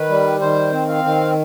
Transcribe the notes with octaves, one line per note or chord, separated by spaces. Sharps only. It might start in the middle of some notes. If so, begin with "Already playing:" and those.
Already playing: D#3 B4
G3
D#3 C5
C4
F5
D#3